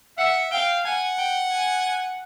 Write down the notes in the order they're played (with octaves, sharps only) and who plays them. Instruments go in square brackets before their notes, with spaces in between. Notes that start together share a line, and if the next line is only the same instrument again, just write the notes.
[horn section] E5 [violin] F#5
[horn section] F5 [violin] G5
[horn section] F#5 [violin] G#5
[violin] G5
G#5